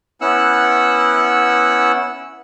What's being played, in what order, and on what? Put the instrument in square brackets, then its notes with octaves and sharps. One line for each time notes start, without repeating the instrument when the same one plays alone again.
[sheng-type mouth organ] B3 C#4 E4 F#5 E6 F#6